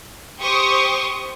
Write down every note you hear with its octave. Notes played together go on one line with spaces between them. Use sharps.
G4 C5 C6 C#6 D#6